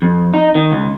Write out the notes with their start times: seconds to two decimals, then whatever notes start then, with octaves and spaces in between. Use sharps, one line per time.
0.02 F2
0.34 D#4
0.55 D#3
0.72 C#2